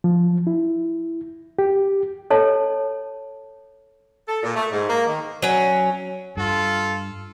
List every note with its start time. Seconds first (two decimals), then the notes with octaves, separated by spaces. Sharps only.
0.04 F3
0.47 E4
1.59 G4
2.30 A4 C#5 A5
4.28 A4
4.43 A#2
4.55 A3
4.72 G#2
4.89 A#3
5.06 D#3
5.42 F#3 C#4
6.37 G2 F4 A4